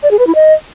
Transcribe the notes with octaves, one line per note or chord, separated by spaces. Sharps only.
D5
G#4
B4
E4
D#5